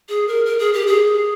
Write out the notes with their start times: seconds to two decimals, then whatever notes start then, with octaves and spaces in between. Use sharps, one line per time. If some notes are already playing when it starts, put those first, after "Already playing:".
0.09 G#4
0.28 A#4
0.46 A#4
0.59 G#4
0.73 G4
0.87 G#4